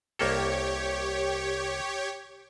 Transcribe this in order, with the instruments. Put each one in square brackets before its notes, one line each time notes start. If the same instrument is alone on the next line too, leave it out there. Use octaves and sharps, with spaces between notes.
[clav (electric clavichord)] C2 A#3 A4 [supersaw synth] G4 C#5